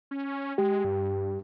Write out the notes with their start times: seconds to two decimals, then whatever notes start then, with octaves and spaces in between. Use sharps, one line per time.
0.11 C#4
0.58 G#3 G4
0.85 G2